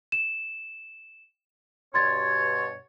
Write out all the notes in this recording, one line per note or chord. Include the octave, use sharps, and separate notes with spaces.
E7
G2 B2 C#5 C6 G#6 A6